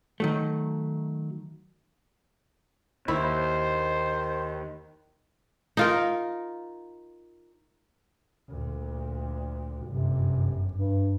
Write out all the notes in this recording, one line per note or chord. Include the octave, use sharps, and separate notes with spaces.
D#3 F#3 A3
D#2 D#3 E4 C5 C#5
D#4 F4 A#4
D2 A#2
G1 F#2 C3
G2